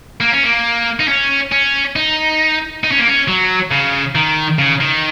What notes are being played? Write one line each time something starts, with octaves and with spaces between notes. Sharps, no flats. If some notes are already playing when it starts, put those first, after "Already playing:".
A#3
C#4
A#3
D#4
C#4
C#4
D#4
D#4
C#4
A#3
C#4
F#3
C#3
D#3
C#3
D#3